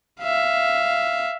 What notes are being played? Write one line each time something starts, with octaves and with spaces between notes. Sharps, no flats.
E5 F5